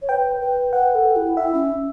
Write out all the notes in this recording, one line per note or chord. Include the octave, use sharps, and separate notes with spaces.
C#5
B4 G5
B4
B4 F#5
A4
E4
E4 E5
C#4